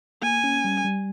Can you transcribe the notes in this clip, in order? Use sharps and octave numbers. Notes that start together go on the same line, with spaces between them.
A#3 G#5
C#4
G3
G3